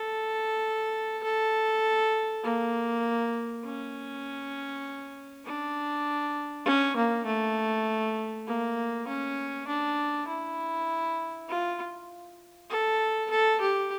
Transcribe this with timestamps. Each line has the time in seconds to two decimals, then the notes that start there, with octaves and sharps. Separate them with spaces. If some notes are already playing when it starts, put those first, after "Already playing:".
Already playing: A4
1.23 A4
2.44 A#3
3.65 C#4
5.46 D4
6.66 C#4
6.97 A#3
7.26 A3
8.47 A#3
9.08 C#4
9.68 D4
10.28 E4
11.49 F4
12.70 A4
13.31 A4
13.61 G4